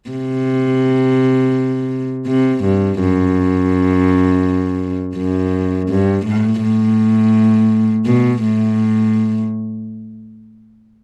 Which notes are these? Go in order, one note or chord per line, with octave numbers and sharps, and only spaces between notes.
C3
C3
G2
F#2
F#2
G2
A2
A2
B2
A2